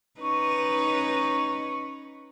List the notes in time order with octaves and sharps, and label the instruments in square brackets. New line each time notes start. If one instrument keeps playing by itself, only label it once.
[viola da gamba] C#4 D#4 B4 [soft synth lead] C#6